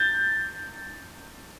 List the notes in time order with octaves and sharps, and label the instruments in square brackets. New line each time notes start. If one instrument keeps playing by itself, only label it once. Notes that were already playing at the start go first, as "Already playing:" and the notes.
Already playing: [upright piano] G6 A6